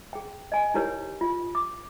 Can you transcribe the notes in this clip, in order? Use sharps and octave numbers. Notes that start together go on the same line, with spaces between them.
G#4 G5
D#5 G#5
D#4 E4 G4 A#4 C#5
F4
D6